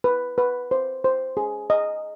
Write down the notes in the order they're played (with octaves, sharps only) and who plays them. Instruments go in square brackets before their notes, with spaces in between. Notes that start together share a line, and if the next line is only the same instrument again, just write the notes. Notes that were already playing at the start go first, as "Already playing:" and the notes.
[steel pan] B4
B4
C5
C5
G#4
D#5